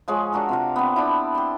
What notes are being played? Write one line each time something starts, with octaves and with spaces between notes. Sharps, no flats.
F3 G#3 G#4 C#5
D4 F#4 A4 A#4
C3 F4 F5
B3 C4
D4 E4
G4 C6